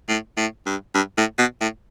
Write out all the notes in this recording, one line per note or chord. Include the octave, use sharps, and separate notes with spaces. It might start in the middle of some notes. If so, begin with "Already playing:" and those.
A2
A2
G2
G2
A2
B2
A2